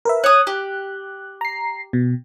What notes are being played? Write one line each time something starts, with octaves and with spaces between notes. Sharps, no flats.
A#4 B4 E5
C#5 D#6 F#6
G4
A#5 C7
B2